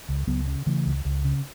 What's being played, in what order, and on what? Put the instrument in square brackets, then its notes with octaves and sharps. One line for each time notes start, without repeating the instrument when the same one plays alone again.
[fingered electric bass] C#2
C#2 F#3 B3
C#3
C#3 E3 A3
C#2
C#2
C#3